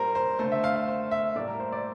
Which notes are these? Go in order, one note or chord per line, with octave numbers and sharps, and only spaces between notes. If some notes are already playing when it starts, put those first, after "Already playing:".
Already playing: A#2 G3 A#3 A#4 C5
C5
A3 C5
D3
E5
F5
F5
C5
E5
A2 G3 A#3 D5
A#4
C5
D5